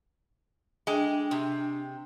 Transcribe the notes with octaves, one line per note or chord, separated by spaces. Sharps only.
G#3 D4 G5
C3